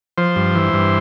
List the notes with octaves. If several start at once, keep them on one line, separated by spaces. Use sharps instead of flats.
F3 C5
G2
E3
G2